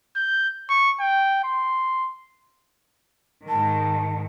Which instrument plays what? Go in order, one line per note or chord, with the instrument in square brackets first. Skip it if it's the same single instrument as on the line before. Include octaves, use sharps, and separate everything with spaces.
[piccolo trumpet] G6
C#6
G5
C6
[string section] G#2 D#3 [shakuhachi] A5